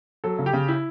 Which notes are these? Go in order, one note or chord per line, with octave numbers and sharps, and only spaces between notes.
F#3 A4
C#3
G4
C#3
E4